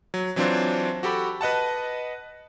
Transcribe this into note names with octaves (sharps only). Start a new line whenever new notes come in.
F#3
E3 F#3 C4 D4 F4 C5
F#4 G4 A4 B5 D6
B4 D#5 F#5 A5